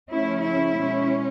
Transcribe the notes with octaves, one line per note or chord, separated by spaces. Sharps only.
C#3 F3 A3 C#4 E4
E4
B2 G#3 C#4